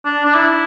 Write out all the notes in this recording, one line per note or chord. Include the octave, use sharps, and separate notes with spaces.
D4
D4
E4